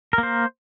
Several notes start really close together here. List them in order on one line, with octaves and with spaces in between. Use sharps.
A#4 A#3 C5